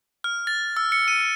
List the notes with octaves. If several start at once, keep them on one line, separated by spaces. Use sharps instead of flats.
F6
A6
E6
C#7
D#7